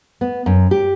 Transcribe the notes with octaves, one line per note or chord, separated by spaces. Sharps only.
B3
F#2
G4